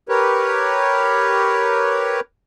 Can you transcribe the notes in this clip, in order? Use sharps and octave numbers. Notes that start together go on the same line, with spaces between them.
G4 A#4 B4 C#5